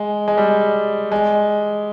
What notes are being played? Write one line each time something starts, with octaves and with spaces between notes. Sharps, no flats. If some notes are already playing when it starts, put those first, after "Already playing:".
Already playing: G#3
G#3
G3
G#3